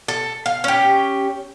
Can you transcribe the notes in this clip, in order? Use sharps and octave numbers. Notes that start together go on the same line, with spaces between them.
A4
F5
C#4 G4